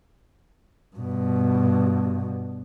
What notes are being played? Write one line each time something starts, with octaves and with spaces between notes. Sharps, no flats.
G2 B2